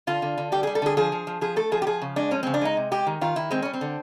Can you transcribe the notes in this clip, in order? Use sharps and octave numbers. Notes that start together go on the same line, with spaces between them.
D3 F4
D3
D3
G3 G4
G3 G#4
A4
D3 G#4
F3 G#4
F3
F3
F3 G#4
A3 A4
F3 G#4
G4
F3 G#4
C#3
G#3 D4
F3 C#4
C#3 C4
D4
G#3 D#4
C3
G#3 G4
D#3
D#3 F4
D#3 E4
G#3 C4
G3 C#4
C4
D3